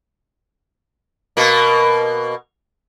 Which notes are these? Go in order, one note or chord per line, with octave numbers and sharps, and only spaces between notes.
B2 A#3